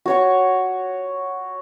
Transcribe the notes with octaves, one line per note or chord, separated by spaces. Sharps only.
F#4 C#5 C#6